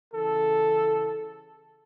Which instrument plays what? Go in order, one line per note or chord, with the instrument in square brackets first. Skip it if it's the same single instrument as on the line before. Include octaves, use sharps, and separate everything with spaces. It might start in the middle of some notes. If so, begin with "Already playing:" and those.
[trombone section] C#3 E3 A4